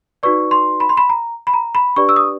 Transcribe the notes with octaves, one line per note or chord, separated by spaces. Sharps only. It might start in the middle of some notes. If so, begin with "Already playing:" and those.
D#4 F#4 B4 D5 C#6
C6
B5
C6
B5
A#5
B5
A#5
B5
D4 G4 B4 D5 C#6
E6
D#6